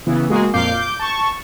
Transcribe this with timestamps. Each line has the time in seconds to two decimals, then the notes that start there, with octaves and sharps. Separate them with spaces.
0.06 C#3 E3 B3
0.30 G#3 A#3 F#4 G#4
0.53 F2 A#2 F5 D6 G6 C7
0.70 D6 G6
0.99 A5 C#6